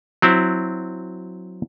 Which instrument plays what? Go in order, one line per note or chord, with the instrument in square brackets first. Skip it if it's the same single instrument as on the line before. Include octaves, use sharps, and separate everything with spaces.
[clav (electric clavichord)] F#3 C4 E4